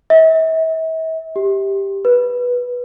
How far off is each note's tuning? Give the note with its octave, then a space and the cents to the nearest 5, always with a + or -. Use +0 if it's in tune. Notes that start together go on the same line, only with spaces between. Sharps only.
E5 -40
G4 +5
B4 -10